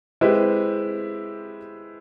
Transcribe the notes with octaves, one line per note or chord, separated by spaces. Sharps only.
G#3 C4 E4 G4 B4